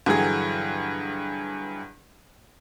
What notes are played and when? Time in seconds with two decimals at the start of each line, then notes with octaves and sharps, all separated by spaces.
0.06 G2 D3 E3 F#3 G#4